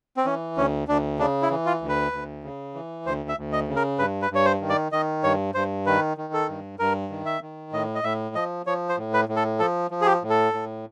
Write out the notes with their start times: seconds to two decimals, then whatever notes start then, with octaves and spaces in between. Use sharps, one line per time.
0.17 C4
0.25 E3 C#4
0.57 D2 C#4
0.88 D2 D4
1.19 C#3 D4
1.42 E4
1.50 E3
1.66 F4
1.81 D2
1.89 B4
2.12 D2
2.44 C#3
2.74 E3
3.06 D2 C5
3.29 E5
3.38 D2
3.53 D#5
3.68 C#3
3.76 A#4
3.99 G2 B4
4.22 B4
4.31 G2 C#5
4.45 C5
4.61 D#3
4.70 D5
4.92 D#3 D#5
5.23 G2 C#5
5.54 G2 C5
5.86 D#3 B4
6.17 D#3
6.33 A4
6.49 G2
6.79 G2 A#4
7.10 D#3
7.26 E5
7.42 D#3
7.72 A2 D#5
7.95 D#5
8.03 A2 E5
8.35 F3 D#5
8.66 F3 C#5
8.89 C5
8.97 A2
9.14 B4
9.29 A2
9.36 A4
9.59 F3 A4
9.91 F3
10.01 G#4
10.06 G4
10.22 A2
10.30 A4
10.53 A2